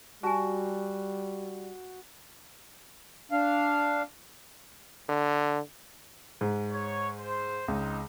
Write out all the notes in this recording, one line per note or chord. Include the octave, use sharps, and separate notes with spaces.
G3 F#4 G#5 A5
D4 F5
D3
G#2
C#5
C5
C#2 C4 D#4